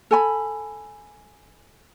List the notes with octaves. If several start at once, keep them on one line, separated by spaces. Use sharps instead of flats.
A4 G#5 B5